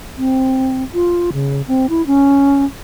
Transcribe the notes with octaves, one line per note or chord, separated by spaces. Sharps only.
C4
F4
C#3
C4
E4
C#4